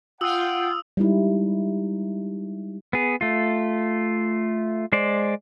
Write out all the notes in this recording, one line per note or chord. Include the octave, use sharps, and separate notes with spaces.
F4 F#5 G5 D#6 E6 F#7
G3 G#3 D#4 E4
B3 G#4
A3 F4
G#3 C5 D5